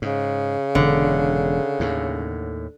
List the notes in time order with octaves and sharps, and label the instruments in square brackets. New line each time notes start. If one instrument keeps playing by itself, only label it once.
[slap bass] G#2 [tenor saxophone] C#3
[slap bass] E1 [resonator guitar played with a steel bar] D3
[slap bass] D#2 A2